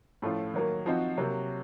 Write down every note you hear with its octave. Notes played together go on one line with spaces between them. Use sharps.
A2 F3 A3 C#4 F4
D#3 F#3 A#3
F3 C4 D#4 F#4
C3 F#3 A#3